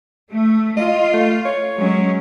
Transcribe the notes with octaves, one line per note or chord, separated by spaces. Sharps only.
A3
F4 D#5
A3
C#5
F#3 G#3 C#4